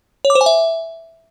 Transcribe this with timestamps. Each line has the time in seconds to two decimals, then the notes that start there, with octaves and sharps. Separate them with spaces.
0.25 C#5
0.30 D6
0.35 C5
0.41 G#5
0.46 E5